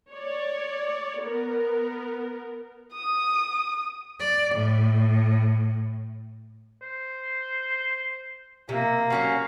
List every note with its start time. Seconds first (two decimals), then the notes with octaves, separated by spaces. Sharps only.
0.12 C#5 D5
1.23 B3 A#4
2.93 D#6
4.20 D5
4.54 A2
6.82 C5
8.69 C3 A#3
9.10 F#3 C#4 F#4 F5